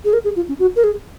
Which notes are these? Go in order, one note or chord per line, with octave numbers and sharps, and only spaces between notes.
G#4
A#4
G#4
F4
C#4
F#4
A#4
G#4